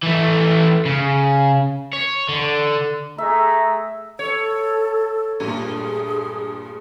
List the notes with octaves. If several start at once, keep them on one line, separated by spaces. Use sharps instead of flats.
E3 A3
C#3
C#5
D3
A3 G#4 E5 A#5
A4 C#5
G2 A#2 A3 G#4